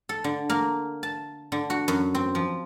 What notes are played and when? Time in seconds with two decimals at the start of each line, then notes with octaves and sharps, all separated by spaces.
0.09 A4
0.24 D3
0.50 A#3
1.03 A5
1.52 D3
1.70 F#4
1.88 F#2
2.15 C4
2.35 F3